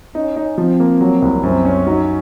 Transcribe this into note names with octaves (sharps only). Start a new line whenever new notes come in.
C#4 D#4
D#4
F3 C4
A#3
F#3
C2
F#2 C4
C#4
F#3 D#4